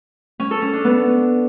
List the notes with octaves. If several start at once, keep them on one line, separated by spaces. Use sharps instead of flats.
C#4
A4
C#4
D4
B3